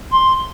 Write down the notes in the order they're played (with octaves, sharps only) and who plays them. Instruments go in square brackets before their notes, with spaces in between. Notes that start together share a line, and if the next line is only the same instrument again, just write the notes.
[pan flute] C6